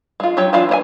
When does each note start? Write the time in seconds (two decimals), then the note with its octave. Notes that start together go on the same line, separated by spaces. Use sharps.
0.20 G#3 F4
0.37 F#3 F4 G4 C#5 G5
0.53 E3 D4 F4 F5
0.69 A#3 C#5 G#5